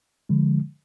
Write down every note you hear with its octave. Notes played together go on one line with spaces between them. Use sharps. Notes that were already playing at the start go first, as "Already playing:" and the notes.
D3 F3 G#3